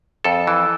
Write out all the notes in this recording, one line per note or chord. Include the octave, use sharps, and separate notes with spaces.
F2 A4
E3